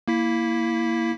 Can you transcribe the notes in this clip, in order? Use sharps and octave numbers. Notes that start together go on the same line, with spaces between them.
A#3 E4 B6